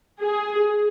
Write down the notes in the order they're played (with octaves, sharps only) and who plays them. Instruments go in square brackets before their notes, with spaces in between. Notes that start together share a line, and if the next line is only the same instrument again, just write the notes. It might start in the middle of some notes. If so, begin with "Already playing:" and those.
[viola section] G#4